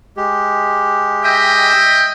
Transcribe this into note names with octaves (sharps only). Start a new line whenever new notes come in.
G#3 G4
D#5 E5 G5